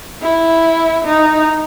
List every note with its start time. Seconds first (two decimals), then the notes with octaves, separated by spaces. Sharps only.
0.23 E4
1.05 D#4